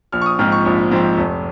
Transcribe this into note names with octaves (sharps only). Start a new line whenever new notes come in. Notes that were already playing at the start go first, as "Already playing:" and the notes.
A#1 F6
C#6
D#6
G#2 F3 C4 F6
C#6
A#1
G#2 F3 C4
F1